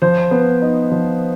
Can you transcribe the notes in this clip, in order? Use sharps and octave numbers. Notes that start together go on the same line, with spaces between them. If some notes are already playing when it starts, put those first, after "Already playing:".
F3 C5
B3
D#4
F3